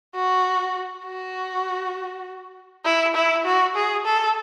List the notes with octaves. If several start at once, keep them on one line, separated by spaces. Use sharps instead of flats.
F#4
F#4
E4
E4
F#4
G#4
A4